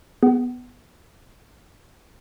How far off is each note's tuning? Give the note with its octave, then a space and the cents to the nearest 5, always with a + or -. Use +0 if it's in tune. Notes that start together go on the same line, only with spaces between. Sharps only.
B3 +0 G#4 +0 F#5 +40